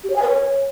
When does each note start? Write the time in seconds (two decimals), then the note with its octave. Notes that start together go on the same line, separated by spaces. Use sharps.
0.04 G4
0.10 C#5
0.16 G#5
0.22 B4
0.28 C#5